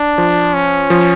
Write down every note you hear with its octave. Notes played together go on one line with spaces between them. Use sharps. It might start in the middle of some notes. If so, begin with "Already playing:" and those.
Already playing: D4
F3
C#4
F3